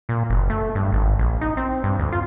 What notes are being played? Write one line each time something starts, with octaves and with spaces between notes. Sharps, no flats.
A#2
F#1
A3
G2
G#1
A#1
D#4
C4
G2
D2
F4